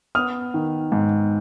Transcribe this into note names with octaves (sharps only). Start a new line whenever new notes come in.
B3 D#6 F6
D#3
G#2